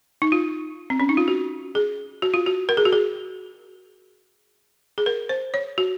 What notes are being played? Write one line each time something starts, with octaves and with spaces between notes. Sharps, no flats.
D#4
F4
C4
C#4
D#4
F4
F#4
G#4
F#4
F4
F#4
A#4
G#4
F#4
G#4
G#4
A#4
C5
C#5
F#4